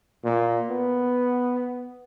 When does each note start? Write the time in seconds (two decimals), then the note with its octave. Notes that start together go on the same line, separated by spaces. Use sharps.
0.24 A#2
0.70 B3